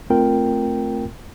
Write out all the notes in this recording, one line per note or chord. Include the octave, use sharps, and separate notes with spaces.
A3 C4 F4 A#4 G5